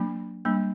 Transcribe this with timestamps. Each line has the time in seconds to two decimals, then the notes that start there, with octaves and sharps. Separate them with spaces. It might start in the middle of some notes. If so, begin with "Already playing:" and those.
Already playing: F#3 A#3 D4
0.45 G3 A#3 D4